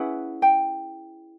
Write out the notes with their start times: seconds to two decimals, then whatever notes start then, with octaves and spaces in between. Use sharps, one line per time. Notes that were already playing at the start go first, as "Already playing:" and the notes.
Already playing: C#4 E4 G#4 B4 F#5
0.42 G5